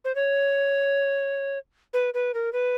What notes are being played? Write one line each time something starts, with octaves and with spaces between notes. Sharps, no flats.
C5
C#5
B4
B4
A#4
B4